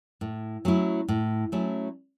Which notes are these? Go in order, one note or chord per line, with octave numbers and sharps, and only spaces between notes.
A2
F#3 A3 C#4 E4
A2
F#3 A3 C#4 E4